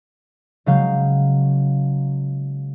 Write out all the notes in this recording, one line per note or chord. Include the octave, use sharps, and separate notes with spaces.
C#3 F#3 G#3 F5 G6